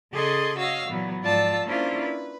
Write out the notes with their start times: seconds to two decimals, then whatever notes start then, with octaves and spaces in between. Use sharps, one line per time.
0.12 C#3 G#4 A4 D5 D#5 C6
0.58 F#4 C#5 D#5 F5 E6
0.89 A#2 E3 F#3 B3
1.22 G#2 F3 F4 D5 A5 E6
1.65 A#3 C#4 D4 E4 F4 C5
2.01 B4